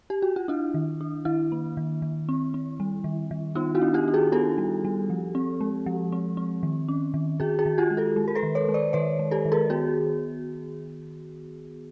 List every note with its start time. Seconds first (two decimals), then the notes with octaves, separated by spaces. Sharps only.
0.10 G4
0.22 F#4
0.36 F4
0.48 D4 E4
0.74 D#3
1.01 D4
1.25 D#3 E4
1.52 A#3
1.77 D#3
2.02 D#3
2.29 C4
2.54 C4
2.80 G3
3.04 D#3
3.31 D#3
3.55 B3 D#4 F4
3.75 E4 F#4
3.81 D4
3.94 F4 G4
4.08 D4
4.14 F#4 G#4
4.32 B3 G4 A4
4.58 G3
4.85 G3
5.10 F3
5.35 C4
5.61 G#3
5.86 F3
6.12 C4
6.37 C4
6.63 D#3
6.88 C#4
7.14 D#3
7.40 D#3 F#4 G#4
7.59 F#4 G#4
7.66 D#3
7.78 F4 G4
7.91 G#3
7.97 G4 A4
8.16 G#3
8.28 A#4
8.35 A4 B4
8.43 D#3
8.55 B4 C#5
8.69 G#3
8.74 C5 D5
8.93 D#3 B4 C#5
9.19 G#3
9.31 G4 A4
9.45 D#3
9.52 G#4 A#4
9.70 B3 F#4 G#4